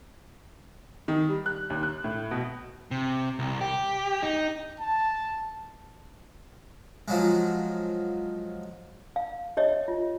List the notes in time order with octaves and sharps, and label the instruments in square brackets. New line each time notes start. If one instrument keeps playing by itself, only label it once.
[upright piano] D#3
G3
F#6
D#2
F#6
A2
B2
[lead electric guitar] C3
C2
G4
D#4
[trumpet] A5
[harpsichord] F3 F#3 G#3
[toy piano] F5
G4 C#5 D#5 E5
F4